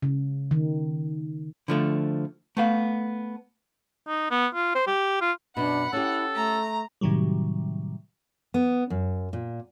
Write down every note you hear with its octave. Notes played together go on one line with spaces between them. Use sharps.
C#3
D#3
D3 F3 A3
A3 B3 F5
D#4
B3
F4
C5
G4
F4
F#2 B2 D4 F#5 B5
C#4 E4 G4 A4
A3 A#5
A2 C3 D#3 F#3 G3
B3
F#2
A#2